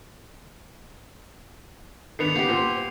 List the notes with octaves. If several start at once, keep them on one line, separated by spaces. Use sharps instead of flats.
D#3 B3 D4 C7 C#7 F7
C#3 B3 G4
A#2 C5 G5